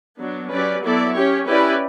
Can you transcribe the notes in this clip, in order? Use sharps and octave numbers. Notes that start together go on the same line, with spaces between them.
F#3 B3 D4
F#3 C#4 G4 B4 D5
F#3 B3 E4 A4 D5
C#4 G4 C#5
C#4 E4 G4 B4 D5